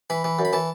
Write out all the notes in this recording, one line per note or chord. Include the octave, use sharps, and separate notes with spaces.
E3 B5
E3
F#2
B5
E3 A5